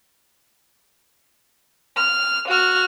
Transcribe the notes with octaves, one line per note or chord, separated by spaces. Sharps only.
F6
F#4 F6